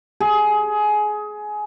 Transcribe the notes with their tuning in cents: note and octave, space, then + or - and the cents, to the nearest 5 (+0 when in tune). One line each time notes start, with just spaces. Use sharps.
G#4 +20